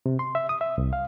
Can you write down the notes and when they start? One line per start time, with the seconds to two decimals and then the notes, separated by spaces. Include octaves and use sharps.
0.06 C3
0.19 C6
0.35 E5
0.49 D#6
0.61 E5
0.78 C2
0.93 F5